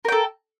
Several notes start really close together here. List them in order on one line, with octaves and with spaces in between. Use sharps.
A#4 G5 A4